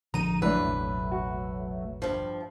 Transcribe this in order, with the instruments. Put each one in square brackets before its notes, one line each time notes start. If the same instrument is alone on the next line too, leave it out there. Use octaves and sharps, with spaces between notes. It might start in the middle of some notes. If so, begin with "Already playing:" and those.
[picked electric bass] A1 D3 F3 [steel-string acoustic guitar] D#4 [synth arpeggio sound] A#5 D#7
[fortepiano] E3 D4 [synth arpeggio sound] F#3 A3 [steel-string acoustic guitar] B4
[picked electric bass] E1 A1
[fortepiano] F#4
[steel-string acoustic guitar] G2 F3